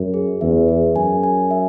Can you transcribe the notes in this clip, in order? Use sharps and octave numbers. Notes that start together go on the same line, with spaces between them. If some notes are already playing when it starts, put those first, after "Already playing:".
Already playing: F#2
G#4
E2 E5
G#4
F#2 G#5
G#5
E5